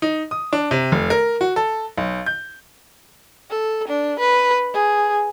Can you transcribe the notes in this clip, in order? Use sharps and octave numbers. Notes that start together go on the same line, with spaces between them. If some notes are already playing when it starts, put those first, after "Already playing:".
D#4
D#6
D4
C3
F1
A#4
F#4
A4
B1
G6
A4
D4
B4
G#4